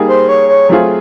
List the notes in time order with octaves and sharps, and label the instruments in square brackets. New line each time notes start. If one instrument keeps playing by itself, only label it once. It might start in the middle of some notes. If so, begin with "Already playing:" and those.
Already playing: [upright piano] G3 A#3 D#4 G#4
[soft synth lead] C5
C#5
C#5
[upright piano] F#3 A3 C4 F4 G#4